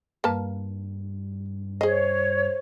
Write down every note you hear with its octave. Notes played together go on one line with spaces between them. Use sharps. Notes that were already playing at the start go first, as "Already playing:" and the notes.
G2 A#3 B4 A5
G#4 C5 C#5 D#5